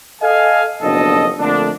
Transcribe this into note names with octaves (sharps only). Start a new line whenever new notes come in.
A4 D#5 F5 G#5
F#1 F2 B2 D4 A4 D#5
F2 D3 A3 A#3 D4